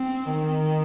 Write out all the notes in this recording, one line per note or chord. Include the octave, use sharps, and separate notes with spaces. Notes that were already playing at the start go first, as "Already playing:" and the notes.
Already playing: C4
D#3